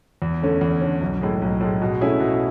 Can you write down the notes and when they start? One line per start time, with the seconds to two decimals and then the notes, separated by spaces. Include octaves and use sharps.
0.22 E2
0.42 D3 A3 C#4
0.61 E2
0.81 D3 A3 C#4
1.01 B1
1.21 A2 G#3
1.41 B1
1.60 A2 G#3
1.82 B2
2.01 A3 C#4 E4 G#4
2.20 B2